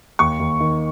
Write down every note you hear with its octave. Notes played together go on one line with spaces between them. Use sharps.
D#2 C#6
D#2
D#3